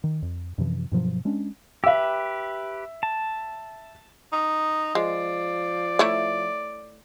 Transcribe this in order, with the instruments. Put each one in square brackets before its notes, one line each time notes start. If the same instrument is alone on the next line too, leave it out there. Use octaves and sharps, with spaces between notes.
[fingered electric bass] D#3
F2
F#2 C3 E3 F3
G2 B2 F3 F#3
G#3 C#4 D4
[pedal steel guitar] G4 B4 [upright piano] E5 E6
[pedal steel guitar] A5
[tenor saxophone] D#4
[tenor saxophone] F3 [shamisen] G#3 [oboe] D5
[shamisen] A3 E4 C#5